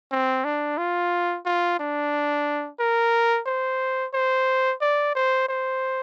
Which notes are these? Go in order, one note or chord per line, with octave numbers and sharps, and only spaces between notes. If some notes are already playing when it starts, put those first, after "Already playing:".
C4
D4
F4
F4
D4
A#4
C5
C5
D5
C5
C5